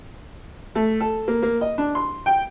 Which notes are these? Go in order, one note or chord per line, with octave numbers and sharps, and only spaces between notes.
A3
A4
A#3
A#3
D#5
D4
C6
G5